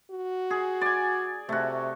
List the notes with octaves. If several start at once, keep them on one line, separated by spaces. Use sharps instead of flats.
F#4
G#4
D5 G#5
C3 A3 F#4